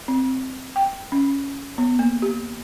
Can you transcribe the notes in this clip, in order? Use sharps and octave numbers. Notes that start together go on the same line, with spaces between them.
C4
G5
C#4
B3
A#3
G4